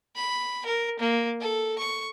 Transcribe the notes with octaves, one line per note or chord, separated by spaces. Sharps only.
B5
A#4
A#3
A4
C#6